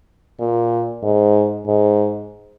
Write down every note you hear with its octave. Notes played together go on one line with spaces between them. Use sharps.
A#2
G#2
G#2